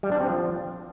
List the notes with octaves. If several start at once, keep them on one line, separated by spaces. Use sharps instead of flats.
G3
D4
C4
F3